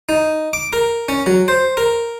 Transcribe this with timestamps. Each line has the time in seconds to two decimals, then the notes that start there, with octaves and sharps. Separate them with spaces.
0.09 D#4
0.53 D6
0.73 A#4
1.09 C#4
1.26 F#3
1.48 C5
1.77 A#4